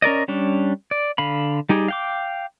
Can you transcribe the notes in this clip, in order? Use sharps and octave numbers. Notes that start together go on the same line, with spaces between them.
C#4 A#4 D5 D#5
G3 C#4 D4
D5
D3 F5 B5
G3 D#4 G4 G#4
F5 G5 D6